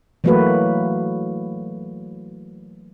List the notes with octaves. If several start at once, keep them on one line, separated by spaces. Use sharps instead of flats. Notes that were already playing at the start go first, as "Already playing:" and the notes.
E3 F#3 A3 A#3 F#4 B4